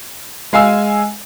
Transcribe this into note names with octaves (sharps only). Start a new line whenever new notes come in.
G#3 F5 G#5 E6